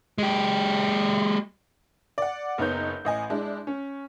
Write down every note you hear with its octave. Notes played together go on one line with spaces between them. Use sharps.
G#3 G4
D5 F#5
F#1 B3 D#4 C#5 G6
A1 D#5 G#5
G#3 D4 E4
C#4